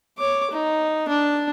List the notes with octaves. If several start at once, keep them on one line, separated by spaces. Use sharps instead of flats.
C#5 D6
D#4
D4